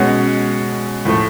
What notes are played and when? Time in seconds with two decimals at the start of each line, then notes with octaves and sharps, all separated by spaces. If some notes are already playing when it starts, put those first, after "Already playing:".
Already playing: B2 G#3 C#4 F#5
1.05 A2 F3 A3